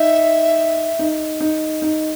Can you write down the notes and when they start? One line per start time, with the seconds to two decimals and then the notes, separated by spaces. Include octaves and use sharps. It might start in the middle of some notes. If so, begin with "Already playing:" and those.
Already playing: D#4 E5
0.99 D#4
1.40 D#4
1.82 D#4